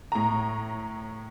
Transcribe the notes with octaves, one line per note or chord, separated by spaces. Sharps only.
A2 A#5